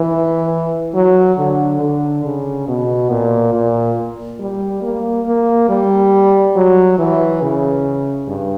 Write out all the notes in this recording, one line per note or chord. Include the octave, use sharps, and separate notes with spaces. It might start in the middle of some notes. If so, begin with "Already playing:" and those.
Already playing: E3
F#3
D3
D3
C#3
B2
A#2
A#2
G3
A#3
A#3
G3
F#3
E3
C#3
G2